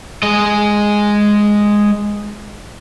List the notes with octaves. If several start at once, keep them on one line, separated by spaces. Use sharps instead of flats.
G#3 D#5